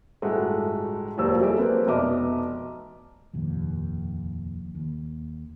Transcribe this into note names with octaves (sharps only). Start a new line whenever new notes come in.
G1 A2 G#3 A3 F#4
F1 D#2 F3 F#3 G4 E6
G3 E4 G#4 A4 D5 E5
F#3 A#3 C4 B4
F1 B2 D#5 E5 D6 F6
F1 A#1 D#2
D#2